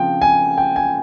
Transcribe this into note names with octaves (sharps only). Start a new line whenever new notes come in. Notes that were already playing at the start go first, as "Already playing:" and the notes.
Already playing: C#3 F3 C4 G5
G#5
G5
G#5